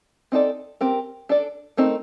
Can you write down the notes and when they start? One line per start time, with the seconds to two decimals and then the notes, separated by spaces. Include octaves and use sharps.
0.32 C4 D#4 A4 D5
0.81 C4 G4 A#4
1.29 D4 A4 D5
1.77 A3 C4 D#4 A#4